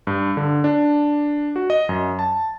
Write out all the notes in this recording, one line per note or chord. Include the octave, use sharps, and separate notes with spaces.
G2
D3
D4
F#4
D#5
F#2
A5